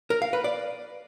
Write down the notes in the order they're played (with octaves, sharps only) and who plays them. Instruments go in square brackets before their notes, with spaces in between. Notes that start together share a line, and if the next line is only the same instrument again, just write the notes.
[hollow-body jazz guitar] A#4
F5
B4
D5